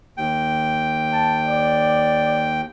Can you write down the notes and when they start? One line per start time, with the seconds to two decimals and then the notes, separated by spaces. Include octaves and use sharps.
0.17 D#2 G5
1.13 A5
1.47 D5